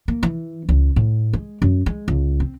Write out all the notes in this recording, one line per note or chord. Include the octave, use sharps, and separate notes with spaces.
A#3
E3
C#2
A2
G#3
F#2
G#3
C#2
C4